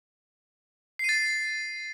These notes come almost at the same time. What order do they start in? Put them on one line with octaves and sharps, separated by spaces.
C7 D#7 A6